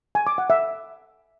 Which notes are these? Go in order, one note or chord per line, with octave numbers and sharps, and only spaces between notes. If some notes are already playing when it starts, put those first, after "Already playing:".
G#5
D6
F#5
E5